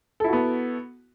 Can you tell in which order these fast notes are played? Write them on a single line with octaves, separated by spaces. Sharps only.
A4 E4 F#4 B3